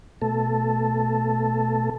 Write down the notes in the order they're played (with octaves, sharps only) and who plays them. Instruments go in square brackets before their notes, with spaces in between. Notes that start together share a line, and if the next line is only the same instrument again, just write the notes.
[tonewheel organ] B2 A3 A4